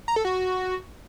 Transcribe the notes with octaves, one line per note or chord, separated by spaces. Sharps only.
A#5
A4
F#4